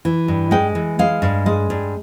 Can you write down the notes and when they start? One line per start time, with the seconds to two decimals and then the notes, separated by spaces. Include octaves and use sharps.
0.05 E3
0.28 G2
0.51 G#3 G5
0.75 E3
0.99 G#3 F5
1.22 G2
1.46 G#3
1.70 G2